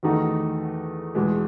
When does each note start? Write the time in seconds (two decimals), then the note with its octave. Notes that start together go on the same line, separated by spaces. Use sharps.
0.03 E2 D#3 A3 D#4 F#4
1.15 E2 B2 G#3